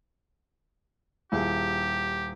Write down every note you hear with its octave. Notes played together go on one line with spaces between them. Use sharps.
D#1 E4 G4 G#4